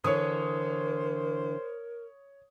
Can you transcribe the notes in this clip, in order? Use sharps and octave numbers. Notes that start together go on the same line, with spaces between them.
D3 E3 A#4 C5 C#5 D#6